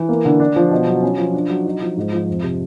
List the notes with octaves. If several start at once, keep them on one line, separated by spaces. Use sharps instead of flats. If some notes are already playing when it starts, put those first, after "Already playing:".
Already playing: E3
A#3
D3
D4
F3
B2
F#3
C#4
F3
D4
F#3
D#4
F3
G#2
F3
F2
C3